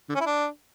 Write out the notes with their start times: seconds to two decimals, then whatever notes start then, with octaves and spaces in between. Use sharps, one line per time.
0.10 D3
0.15 C#4
0.21 E4
0.26 D4